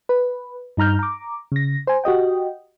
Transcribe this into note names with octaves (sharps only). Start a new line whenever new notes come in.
B4
G2 D#4 A#5 F6 G6
A#5 D6
C#3 A#6
C5 G#5
F#4 G4 D#5 G5